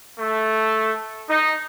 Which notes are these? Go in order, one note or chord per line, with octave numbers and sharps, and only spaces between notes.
A3
D#4